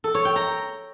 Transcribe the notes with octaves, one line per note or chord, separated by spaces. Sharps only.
A4
C#5
G5
A#5